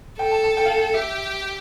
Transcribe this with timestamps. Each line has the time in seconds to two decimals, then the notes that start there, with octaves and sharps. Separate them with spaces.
0.19 A4 G5
0.31 A5
0.43 A5
0.57 G5
0.66 F5
0.77 G5
0.94 G4 E5